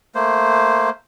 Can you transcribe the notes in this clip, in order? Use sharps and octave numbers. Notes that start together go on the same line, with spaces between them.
A3 A#3 C5